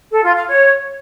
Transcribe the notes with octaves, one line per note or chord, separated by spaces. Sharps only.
A4
F4
F5
C#5